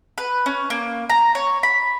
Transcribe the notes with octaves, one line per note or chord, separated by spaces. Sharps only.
B4
C#4
A#3
A#5
C#5
B5